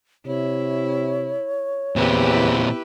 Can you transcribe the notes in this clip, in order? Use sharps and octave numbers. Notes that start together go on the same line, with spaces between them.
C3 E4 C#5
E2 A#2 C4 E4 G4 B4